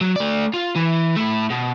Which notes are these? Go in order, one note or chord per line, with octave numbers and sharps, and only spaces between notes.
F#3
A3 D5
F4
E3
A3 E4
B2